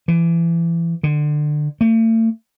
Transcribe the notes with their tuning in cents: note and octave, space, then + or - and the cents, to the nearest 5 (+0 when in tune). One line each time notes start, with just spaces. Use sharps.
E3 +30
D3 +25
A3 +40